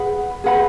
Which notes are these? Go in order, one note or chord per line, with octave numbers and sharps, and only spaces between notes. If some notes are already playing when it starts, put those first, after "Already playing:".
Already playing: G#4 B4 F#5 B5
G#4 B4 F#5 B5